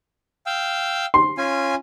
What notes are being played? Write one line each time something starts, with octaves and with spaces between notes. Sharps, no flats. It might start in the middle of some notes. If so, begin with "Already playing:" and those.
F5 G5 E6
C6
C#4 F4 G#5